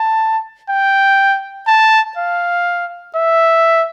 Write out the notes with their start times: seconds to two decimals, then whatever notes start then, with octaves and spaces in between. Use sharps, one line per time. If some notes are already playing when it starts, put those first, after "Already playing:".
Already playing: A5
0.69 G5
1.67 A5
2.17 F5
3.15 E5